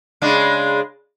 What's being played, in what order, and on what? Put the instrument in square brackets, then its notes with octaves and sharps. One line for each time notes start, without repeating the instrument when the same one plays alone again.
[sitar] C#3 G#3 D4